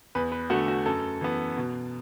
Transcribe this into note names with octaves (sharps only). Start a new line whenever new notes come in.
E2 B4
B4
D3 A3 F#4
F#4
F#2 A4
E3 B3
B2